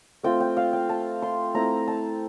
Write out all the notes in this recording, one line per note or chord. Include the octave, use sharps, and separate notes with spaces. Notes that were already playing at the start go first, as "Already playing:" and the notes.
A3 C4 F4 G5
G5
F5
G5
A5
C6
A3 C4 E4 A#5
A5